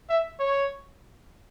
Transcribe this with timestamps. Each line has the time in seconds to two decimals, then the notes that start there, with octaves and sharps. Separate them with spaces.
0.10 E5
0.40 C#5